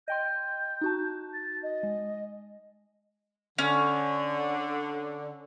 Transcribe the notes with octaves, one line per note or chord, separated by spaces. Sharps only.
D#5 G5 C6 G6
D#4 F#4 A5
A6
D#5
G#3
D3 C#4